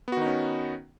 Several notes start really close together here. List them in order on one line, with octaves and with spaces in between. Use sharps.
B3 F#4 D#3 D#4 C#4